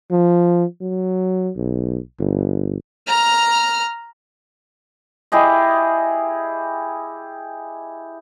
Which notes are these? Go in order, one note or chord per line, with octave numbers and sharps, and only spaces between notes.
F3
F#3
B1
G1
A#5 F6
E4 G4 G#4 D#5